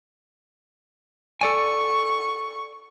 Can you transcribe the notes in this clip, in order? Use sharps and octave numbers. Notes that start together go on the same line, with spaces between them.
A4 D5 G#5 C#6